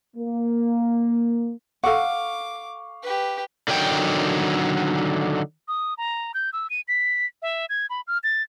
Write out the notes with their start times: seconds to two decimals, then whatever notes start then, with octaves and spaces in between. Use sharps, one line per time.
0.17 A#3
1.84 A4 F5 F#5 C#6 D6
3.03 G4 B4
3.68 D3 D#3 F#3 G5
5.68 D#6
5.98 A#5
6.34 G6
6.53 E6
6.70 D#7
6.88 B6
7.42 E5
7.69 G#6
7.90 B5
8.07 F6
8.24 A6